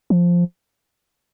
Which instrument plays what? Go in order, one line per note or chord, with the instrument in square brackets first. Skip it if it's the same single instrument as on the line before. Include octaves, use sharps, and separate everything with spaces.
[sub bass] F3